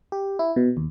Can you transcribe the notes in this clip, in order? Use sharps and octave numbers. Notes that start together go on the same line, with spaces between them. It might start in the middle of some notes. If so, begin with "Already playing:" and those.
G4
E4
B2
D#2